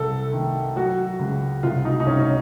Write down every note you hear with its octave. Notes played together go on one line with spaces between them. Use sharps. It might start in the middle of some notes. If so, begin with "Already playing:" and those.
Already playing: C2 A4
D#3
F#3 F#4
C#2
C2 F4
D#4
D#4
C2 C#4
C#4